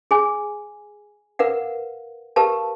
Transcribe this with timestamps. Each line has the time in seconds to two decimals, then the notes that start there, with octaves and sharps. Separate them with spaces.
0.11 G#4 G#5
1.39 A#4 B4 F5 F#5
2.36 G4 A#4 B4 F5 A5